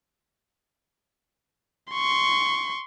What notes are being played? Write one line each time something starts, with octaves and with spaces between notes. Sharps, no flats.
C6 C#6